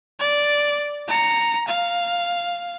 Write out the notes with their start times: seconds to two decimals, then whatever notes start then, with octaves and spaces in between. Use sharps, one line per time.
0.20 D5
1.08 A#5 C#7
1.68 F5